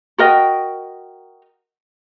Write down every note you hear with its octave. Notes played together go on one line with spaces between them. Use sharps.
F#4 A#4 D#5 G5